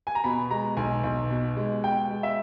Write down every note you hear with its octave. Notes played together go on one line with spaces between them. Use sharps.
G#5
A#5
B2 B5
G#3 A#5
B1 G#5
B1
B2
G#3
B2 G5
G#3
E5